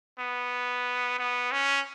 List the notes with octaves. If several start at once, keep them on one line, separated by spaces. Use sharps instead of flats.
B3
B3
C#4